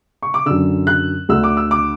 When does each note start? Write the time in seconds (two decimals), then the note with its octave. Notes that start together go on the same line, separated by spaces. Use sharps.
0.23 C#6
0.34 D6
0.46 F#2 D3 E6
0.87 F#6
1.29 D2 D3 E6
1.44 D6
1.57 E6
1.71 D6